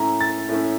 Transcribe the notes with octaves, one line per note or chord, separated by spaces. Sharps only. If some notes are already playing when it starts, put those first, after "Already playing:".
Already playing: A2 A3 C#4 A#5
A6
A2 A3 C#4